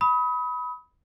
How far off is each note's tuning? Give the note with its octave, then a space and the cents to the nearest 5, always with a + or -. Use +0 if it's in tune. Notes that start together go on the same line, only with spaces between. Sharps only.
B5 +0 D#6 +35